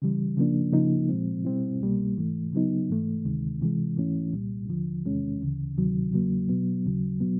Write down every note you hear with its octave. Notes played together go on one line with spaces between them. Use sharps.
C#3 E3 G3
C#3 F3 A#3 D4
C#3 F3 A#3 D#4
A#2 F3 G#3 C4
B2 G3 C4 E4
C2 B2 G3 A#3
G#2 E3 A3
C#3 F#3 B3 D#4
G#2 E3 A3
D2 C3 D#3 G#3
C3 E3 G#3
G#2 E3 A3 C#4 E4
C2 A#2 G3
D#2 D3 F3
E2 C3 D#3 G#3 C#4
D2 C#3 E3
D2 C3 D#3 F#3
E2 C#3 F#3 A#3
B2 F#3 B3
D#2 C#3 F#3
B2 F#3 B3